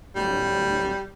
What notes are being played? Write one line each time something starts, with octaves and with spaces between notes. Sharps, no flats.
D1 G3